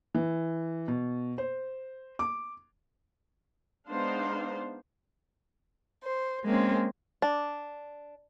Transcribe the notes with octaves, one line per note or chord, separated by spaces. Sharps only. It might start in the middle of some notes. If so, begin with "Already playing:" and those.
E3
B2
C5
D6
G#3 B3 D4 D#4 C5 F5
C5
G#3 A#3 C4 C#4
D4